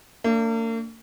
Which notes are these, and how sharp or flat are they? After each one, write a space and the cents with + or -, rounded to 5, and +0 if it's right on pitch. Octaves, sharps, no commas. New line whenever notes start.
A#3 -45 D4 -10